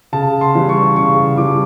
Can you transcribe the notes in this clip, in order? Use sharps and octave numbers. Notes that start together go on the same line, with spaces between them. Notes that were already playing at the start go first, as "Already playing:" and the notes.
C#3 A5
C6
E3 G3
C#6
C#3 C#6
E3 G3 D6